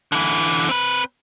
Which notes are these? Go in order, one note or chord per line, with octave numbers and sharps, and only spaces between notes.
D3 E3
C4 B4